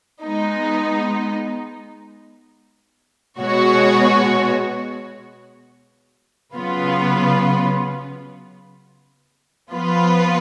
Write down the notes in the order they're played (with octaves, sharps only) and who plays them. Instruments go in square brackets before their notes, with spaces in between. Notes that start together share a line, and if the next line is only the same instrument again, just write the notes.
[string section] G#3 B3 D#4
B2 G#3 B3 F#4 C#5
C#3 F#3 B3 F4 B4
F3 B3 F4 B4